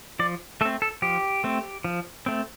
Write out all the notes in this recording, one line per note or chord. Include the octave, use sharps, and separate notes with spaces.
F3 D5
A3 C4 A4
A4
F3 G4
A3 C4
F3
A3 C4